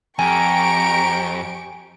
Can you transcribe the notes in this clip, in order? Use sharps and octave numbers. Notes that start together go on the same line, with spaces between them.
F2 G4 G#5 A#5 C#6 D7